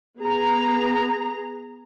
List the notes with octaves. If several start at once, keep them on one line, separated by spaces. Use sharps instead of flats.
B3 G#4 A#5